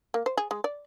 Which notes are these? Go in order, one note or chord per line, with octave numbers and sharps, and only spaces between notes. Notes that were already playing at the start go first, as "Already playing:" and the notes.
A#3
C5
G#4
G#3
D5